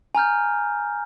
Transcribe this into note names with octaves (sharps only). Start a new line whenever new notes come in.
G#5 A#5 F6 G6